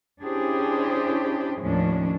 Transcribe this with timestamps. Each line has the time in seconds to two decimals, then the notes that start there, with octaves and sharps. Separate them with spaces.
0.23 C#4 D4 E4 G4 G#4 C5
1.62 D#2 A2 F3 C#4 D4